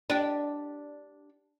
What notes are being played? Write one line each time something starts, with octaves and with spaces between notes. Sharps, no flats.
D4 G4